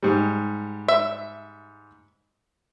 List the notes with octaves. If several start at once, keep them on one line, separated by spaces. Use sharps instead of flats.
G#2 G3
E5